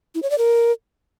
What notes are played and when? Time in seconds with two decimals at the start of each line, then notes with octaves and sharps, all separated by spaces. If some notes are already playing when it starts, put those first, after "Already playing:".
0.15 E4
0.23 C#5
0.30 D5
0.38 A#4